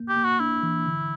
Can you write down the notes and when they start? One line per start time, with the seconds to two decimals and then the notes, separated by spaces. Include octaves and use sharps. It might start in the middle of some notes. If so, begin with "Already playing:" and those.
Already playing: A#3
0.09 G4
0.16 A#3
0.24 F#4
0.40 D4 E4
0.63 E3
0.86 D3